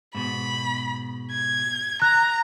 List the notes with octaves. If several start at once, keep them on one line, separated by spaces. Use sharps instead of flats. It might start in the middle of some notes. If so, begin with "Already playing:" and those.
G#2 B2 B5
G#6
A#5 F#6